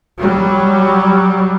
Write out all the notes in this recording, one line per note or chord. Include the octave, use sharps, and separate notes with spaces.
F#3 G3